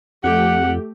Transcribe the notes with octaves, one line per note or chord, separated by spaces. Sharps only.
F2 A3 G4 F#5